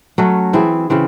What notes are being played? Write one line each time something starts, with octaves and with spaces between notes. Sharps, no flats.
F#3 A3 C#4 F#4
E3 C4 E4 G#4
C#3 E3 C4